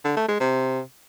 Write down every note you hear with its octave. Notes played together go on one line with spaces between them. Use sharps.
D3
A3
G#3
C3